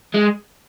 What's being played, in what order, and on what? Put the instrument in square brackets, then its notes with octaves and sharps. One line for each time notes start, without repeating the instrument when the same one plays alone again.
[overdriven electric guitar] G#3